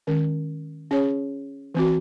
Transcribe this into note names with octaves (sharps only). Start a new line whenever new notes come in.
D#3 G#3 C#4
C#4 G#4 C#5
E3 C4 F#4